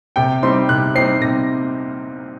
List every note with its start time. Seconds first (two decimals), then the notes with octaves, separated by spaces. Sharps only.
0.16 C3 G5
0.43 G3 C4 D#4 C6
0.69 C3 F#6
0.95 G3 C4 D#4 C7
1.21 C3 A#6